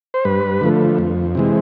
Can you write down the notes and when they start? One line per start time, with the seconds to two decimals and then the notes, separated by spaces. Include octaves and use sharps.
0.14 C5
0.25 G2 B4
0.61 D3 F3 A3
0.99 F2
1.35 C3 E3 G#3